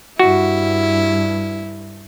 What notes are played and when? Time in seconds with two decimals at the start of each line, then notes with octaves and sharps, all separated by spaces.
0.19 G2 E4 F#4